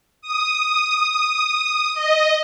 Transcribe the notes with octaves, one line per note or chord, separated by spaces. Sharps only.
D#6
D#5